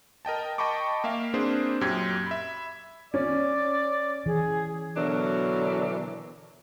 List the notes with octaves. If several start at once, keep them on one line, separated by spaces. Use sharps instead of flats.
A#4 D#5 G5 A5
D#5 G5 A5 B5 C#6 D6
A#3 E5 F5
A#3 C4 D4 G#4 B4 C5
F#2 A#2 G4 G#6
E5 B5
C#4 D5
E3 G#4
B2 D3 E3 F#3 D4 A#4